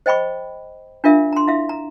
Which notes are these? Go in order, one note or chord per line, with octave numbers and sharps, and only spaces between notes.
C5 D#5 G5 B5 C#6
D4 F4 A#4 E5 F5
A#5 C6
E4 E5 F5
A#5